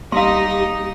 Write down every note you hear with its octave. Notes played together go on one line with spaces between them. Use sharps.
B1 G3 A#3 D#4 G4 D#5 F5 C6